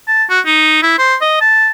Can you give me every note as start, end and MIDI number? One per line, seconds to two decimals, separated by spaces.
0.08 0.24 81
0.30 0.40 66
0.46 0.82 63
0.83 0.94 64
0.98 1.15 72
1.21 1.37 75
1.41 1.71 81